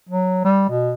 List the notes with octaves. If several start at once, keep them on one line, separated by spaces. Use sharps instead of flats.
F#3
G3
B2